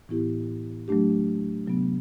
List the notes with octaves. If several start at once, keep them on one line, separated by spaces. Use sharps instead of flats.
A2 E3 B3 E4 G4
F#3 A3 D4 G4
C3 F#3 B3